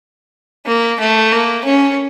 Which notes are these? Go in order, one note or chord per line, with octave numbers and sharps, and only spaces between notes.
A#3
A3
A#3
C#4